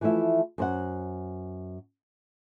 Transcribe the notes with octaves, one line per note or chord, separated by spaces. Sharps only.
E3 F3 A3 E4 E5
F#2 C5 F#5